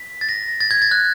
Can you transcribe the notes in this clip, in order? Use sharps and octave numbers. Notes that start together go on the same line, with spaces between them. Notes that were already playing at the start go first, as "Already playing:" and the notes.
Already playing: B6
A6
A#6
A6
G#6
A6
F#6